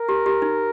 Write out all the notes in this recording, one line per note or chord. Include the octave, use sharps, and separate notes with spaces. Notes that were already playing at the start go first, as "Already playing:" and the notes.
Already playing: A#4
G4
G4
D#4